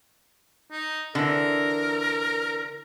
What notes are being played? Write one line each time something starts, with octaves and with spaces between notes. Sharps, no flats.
D#4
D3 E3 A#4